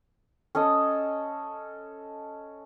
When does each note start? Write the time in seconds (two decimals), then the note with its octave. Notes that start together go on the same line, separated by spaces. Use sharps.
0.55 C#4 A4 D#5 D#6